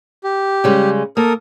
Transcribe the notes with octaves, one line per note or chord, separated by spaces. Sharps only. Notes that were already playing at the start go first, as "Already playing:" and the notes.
G4
C#3 G3 G#3
A#3 A4 A#4 D#6